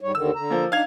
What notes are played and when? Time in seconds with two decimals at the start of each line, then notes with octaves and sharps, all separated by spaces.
0.01 G#2 G3 C#5
0.15 D#2 D3 D#3 E6
0.36 D3 A#5
0.50 F3 A#3
0.72 D4 D#4 F5 G#6 F7